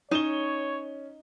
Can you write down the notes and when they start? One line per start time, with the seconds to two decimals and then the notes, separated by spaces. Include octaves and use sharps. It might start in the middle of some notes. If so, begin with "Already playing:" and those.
0.11 C#4 D#4 C#5 E7 G7